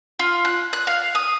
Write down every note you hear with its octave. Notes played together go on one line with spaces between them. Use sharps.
F4
F#6
F#6
F5
D#6